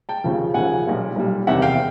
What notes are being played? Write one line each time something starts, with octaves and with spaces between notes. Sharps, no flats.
G5 A5
D#2 C#3 F3
D#2 C#3 F3 F#5 G#5
B1 A#2 G3
B1 A#2 G3
F#1 E2 C3 D#3 E5 F#5
F5 G5